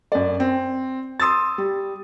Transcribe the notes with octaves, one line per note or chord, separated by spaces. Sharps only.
F#2 D5
C4
C6 D#6 E6 A6
G3